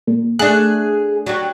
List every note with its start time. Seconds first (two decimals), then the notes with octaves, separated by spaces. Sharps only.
0.07 A#2
0.39 A3 D4 G#4 F#6
1.26 F#3 D4 G4